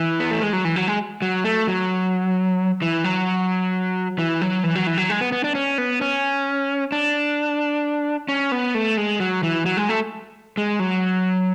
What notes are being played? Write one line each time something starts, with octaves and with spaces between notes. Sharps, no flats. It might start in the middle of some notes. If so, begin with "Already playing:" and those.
Already playing: E3
B3
A3
G#3
F#3
E3
F#3
G#3
F#3
A3
F#3
E3
F#3
E3
F#3
E3
F#3
E3
F#3
G#3
B3
B3
D4
C#4
B3
C#4
D4
C#4
B3
A3
G#3
F#3
E3
F#3
G#3
A3
G#3
F#3